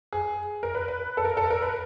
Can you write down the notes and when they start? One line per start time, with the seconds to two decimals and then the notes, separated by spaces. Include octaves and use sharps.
0.13 G#4
0.63 A#4
0.75 B4
0.88 B4
1.17 A4
1.25 A#4
1.37 A4
1.50 A#4
1.62 B4